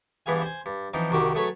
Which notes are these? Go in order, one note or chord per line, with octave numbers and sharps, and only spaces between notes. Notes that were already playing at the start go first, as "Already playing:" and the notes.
G2 E3 B3 G#4 F5 G#5
C5 G#5
G2
E3 F3 C4 D#4
C2 D#3 F#4 G4 F#5
F#3 A3 G#4 A4 B4 C#5